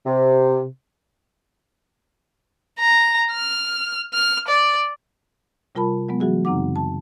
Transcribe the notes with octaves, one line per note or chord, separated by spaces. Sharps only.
C3
A#5
F6
F6
D5
C3 G3 F4 A#4 A5 B5
F#3 G#3 B3
E3 F#3 F#4 G#4
F#2 C#3 C4 D#4 F#5 D6
A5